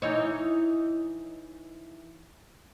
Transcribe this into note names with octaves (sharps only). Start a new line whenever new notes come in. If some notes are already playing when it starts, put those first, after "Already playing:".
E3 D#4 C#5